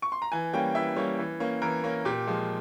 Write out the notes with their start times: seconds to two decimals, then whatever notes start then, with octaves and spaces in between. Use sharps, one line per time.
0.02 C#6
0.12 C6
0.22 A#5
0.32 E3 G#5
0.53 G3 A#3 C#4 G5
0.75 E3 E5
0.96 G3 A#3 C#4 C#5
1.19 E3
1.40 A#3 C#4
1.62 E3 A#4
1.84 A#3 C#4
2.05 A#2 G4
2.27 F3 G#3